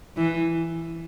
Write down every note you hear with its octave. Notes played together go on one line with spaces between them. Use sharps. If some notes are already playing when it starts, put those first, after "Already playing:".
E3